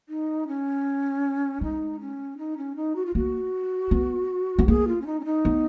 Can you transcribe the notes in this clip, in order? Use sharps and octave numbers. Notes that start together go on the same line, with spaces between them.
D#4
C#4
G#3 D#4
C#4
D#4
C#4
D#4
F#4
F4
A#3 F#4
B3
B3
A#3 G#4
F4
C#4
D#4
C#4
D#4
B3